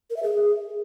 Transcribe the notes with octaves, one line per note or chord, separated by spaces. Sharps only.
A#4
E5
G#4